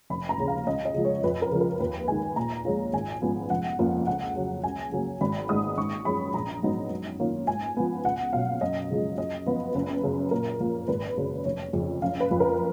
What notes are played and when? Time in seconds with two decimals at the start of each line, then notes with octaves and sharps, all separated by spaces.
0.10 F1 B5
0.29 A#5
0.37 D#2 C#3
0.48 F5
0.66 C#2 D#5
0.85 D#5
0.94 C#3 F3 G#3
1.05 C#5
1.24 F2 B4
1.42 A#4
1.51 C#3 F3
1.61 A#4
1.80 D#2 B4
2.08 D#3 G#3 G#5
2.36 A#2 A#5
2.65 F3 G#3 C#4 F4
2.93 G#1 G#5
3.22 G#2 F3 B3
3.50 F1 F#5
3.79 F2 F3 A#3 F4
4.07 C#2 F#5
4.36 C#3 F#3
4.64 C#2 G#5
4.92 C#3 F#3 A#3
5.21 G#1 B5
5.49 G#2 D#3 G#3 D#4 D#6
5.77 G#1 C#6
6.05 F#2 F3 G#3 C#4 B5
6.34 A#1 A#5
6.63 G#2 F#3 B3 D#4
6.90 F#2
7.19 D#3 A#3 C#4 F4
7.47 G#2 G#5
7.77 F3 B3
8.04 C#2 F#5
8.33 B2 F#3 F5
8.61 F#2 D#5
8.90 C#3 F3 G#3
9.18 F#2 D#5
9.46 F3 B3 F4 B4
9.75 F#1 B4
10.03 F#2 C#3
10.31 A#2 A#4
10.60 F3 A#3
10.88 G#1 B4
11.17 F#2 C#3 F#3 C#4
11.45 F1 C#5
11.73 F2 C#3
12.01 F#1 F5
12.20 B4
12.31 F2 F3
12.40 A#4